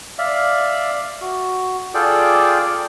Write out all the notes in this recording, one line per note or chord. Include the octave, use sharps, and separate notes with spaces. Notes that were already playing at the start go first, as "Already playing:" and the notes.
D5 E5 F5
F#4
F4 G#4 A4 D5 G5 D6